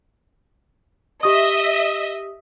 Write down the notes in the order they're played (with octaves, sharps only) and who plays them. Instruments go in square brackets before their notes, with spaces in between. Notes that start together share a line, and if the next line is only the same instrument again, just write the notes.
[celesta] G4 D#6 [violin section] D#5 E5